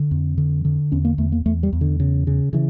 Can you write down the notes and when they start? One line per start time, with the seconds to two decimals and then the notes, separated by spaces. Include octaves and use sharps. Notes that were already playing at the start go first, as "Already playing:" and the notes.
Already playing: D3
0.11 F2
0.38 D3
0.65 D3
0.92 E2 C#4
1.05 A#3
1.18 E2 A3
1.32 A#3
1.46 E2 A3
1.63 G3
1.73 E2
1.81 D3
2.00 C#3
2.27 C#3
2.53 C#3 E3